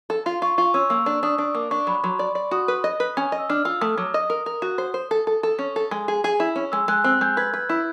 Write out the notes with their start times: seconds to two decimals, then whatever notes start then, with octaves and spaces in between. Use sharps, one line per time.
0.10 A4
0.26 F4 C6
0.42 F4 C#6
0.58 F4 C#6
0.74 C#4 E6
0.90 A#3 E6
1.06 D4
1.23 D4 D#6
1.38 D4
1.55 A#3 D6
1.71 D4 C#6
1.87 F#3 B5
2.04 F#3 C6
2.19 D5
2.35 D5
2.51 F#4 D#6
2.68 B4
2.84 D#5
3.00 B4
3.17 C#4
3.32 D#5
3.38 E6
3.49 D4 F6
3.65 F4 E6
3.81 A3 D#6
3.97 F#3 D6
4.14 D#5 D#6
4.30 A#4
4.46 A#4
4.62 F#4
4.78 C5
4.94 C5
5.11 A4
5.27 A4
5.43 A4
5.59 C#4
5.76 A4
5.91 G#3
6.08 G#4
6.24 G#4
6.40 E4
6.56 C#4
6.72 G#3 E6
6.88 G#3 F#6
7.04 C4 F#6
7.21 G#3 G6
7.37 B4 G#6
7.53 B4
7.69 E4